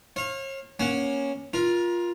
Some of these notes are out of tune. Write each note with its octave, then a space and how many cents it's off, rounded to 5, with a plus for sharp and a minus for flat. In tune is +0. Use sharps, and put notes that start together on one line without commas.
C#5 -40 F5 +0
A#3 +20 C#4 +0 F#5 +0
F4 +0 A#4 +35